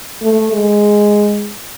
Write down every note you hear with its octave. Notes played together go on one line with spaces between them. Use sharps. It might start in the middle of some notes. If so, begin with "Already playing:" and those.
A3
G#3